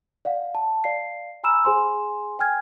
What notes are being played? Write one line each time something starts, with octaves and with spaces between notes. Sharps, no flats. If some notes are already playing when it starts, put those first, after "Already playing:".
D5 F5 F#5
A5
D5 F5 C7
G#5 A#5 B5 E6 F6 E7
G#4 C5 G#5 C6
G5 G#5 F6 G#6